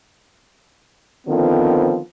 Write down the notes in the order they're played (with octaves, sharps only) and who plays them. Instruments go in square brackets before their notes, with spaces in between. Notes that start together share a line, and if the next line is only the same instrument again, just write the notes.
[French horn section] D3 D#3 F3 B3 C4